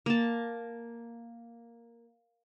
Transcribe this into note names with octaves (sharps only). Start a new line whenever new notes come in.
A#3 A5